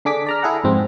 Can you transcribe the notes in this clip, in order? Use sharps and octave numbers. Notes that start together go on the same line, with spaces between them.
D3 D4 G#4 D6 B6
D5 A#5 F6
E4 G#4 A4 F#5 A#5
F2 G#2 C4